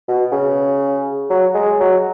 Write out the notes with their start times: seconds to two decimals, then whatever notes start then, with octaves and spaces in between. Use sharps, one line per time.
0.08 B2
0.32 C#3
1.30 F#3
1.54 G#3
1.80 F#3